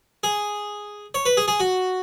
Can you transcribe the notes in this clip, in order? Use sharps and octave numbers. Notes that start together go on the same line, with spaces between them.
G#4
C#5
B4
G#4
G#4
F#4